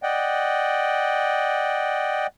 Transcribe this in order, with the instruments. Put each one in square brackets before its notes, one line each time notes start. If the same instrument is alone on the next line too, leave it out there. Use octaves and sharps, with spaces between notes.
[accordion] D5 D#5 F#5 G5